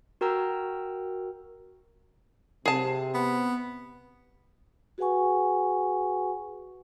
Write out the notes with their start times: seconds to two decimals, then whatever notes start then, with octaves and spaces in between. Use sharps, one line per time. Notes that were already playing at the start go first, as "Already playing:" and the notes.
0.21 F#4 A#4 G5 A#5 E6
2.66 C3 G#4 A5
3.14 B3
4.98 F#4 G#4 B4 F#5 G#5 C#6